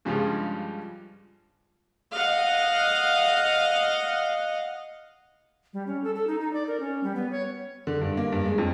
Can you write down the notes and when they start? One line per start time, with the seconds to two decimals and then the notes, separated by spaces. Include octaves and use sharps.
0.05 G2 C#3 F3 G3 G#3 F4
2.11 D#5 F5 F#5
5.73 G3
5.87 C#4
6.04 A4
6.15 A4
6.27 D#4
6.40 D#4
6.53 D5
6.67 A#4
6.80 C#4
7.03 G3
7.15 B3
7.32 C#5
7.87 D3
8.01 G2
8.17 A#3
8.32 G2
8.46 G#3
8.58 F2